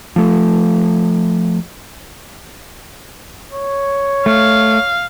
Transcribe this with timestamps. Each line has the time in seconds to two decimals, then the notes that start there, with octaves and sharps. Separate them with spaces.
0.16 F3 A3
3.53 C#5
4.26 A3 F5